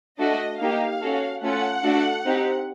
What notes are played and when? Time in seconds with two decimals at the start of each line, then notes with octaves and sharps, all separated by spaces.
0.19 A3 D4 F#4 A4 D#5
0.60 A#3 D#4 G4 F5
1.01 C#4 F#4 A4
1.41 A3 C#4 F4 A4 F#5
1.82 A3 D4 F#4 A4
2.24 C4 D#4 G4